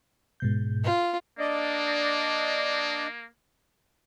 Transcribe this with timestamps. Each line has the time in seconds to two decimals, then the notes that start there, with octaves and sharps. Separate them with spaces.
0.40 G#2 B2 G6
0.84 F4
1.39 A#3 D4 D5 D#5